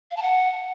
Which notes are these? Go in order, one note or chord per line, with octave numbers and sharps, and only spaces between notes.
F5
A5
F#5